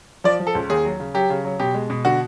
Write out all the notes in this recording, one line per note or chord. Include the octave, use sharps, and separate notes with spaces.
F3 D5
F3
A4
C#2
D#2 G#4
F#3
C#3
F#3 G4
C#3
F#3
B2 G4
G#3
B2
D3 F#4